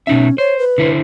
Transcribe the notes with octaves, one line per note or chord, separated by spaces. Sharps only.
B2 C#4 D#4 E5
C5 C#5
B4
D3 E4 C5